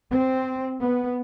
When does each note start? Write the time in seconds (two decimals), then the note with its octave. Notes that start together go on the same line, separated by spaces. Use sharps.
0.10 C4
0.80 B3